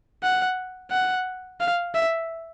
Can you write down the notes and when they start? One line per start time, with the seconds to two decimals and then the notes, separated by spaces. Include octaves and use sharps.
0.24 F#5
0.91 F#5
1.60 F5
1.95 E5